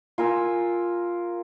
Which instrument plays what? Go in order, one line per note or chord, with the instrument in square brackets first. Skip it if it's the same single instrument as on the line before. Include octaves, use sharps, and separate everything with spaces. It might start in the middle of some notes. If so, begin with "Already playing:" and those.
[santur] F4 A#4 G#5 E6